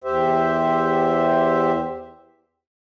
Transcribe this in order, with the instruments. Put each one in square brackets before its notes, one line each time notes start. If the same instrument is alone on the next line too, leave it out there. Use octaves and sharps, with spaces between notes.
[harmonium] E2 G4 C5 E5